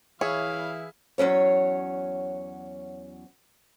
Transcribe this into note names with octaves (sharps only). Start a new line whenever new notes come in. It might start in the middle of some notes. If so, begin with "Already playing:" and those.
E3 E4 G#4 C#5 E5 F5
E2 F#3 C#4 C#5